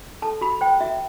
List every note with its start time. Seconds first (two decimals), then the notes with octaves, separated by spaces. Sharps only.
0.22 A4 A5
0.41 F#4 B5
0.61 C5 G5
0.80 F#4 E5